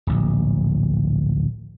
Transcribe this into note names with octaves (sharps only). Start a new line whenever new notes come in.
D1 A#1